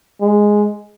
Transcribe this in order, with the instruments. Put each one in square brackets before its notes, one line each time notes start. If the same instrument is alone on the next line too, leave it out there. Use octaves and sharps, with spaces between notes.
[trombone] G#3